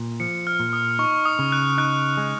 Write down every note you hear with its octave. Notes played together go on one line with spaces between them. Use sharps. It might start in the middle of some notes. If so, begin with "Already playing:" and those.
Already playing: A#2
F3 C#7
F6
A#2
D#6
D#4 C#6
D#6
C#3
F#6
D#4 F#6
G#3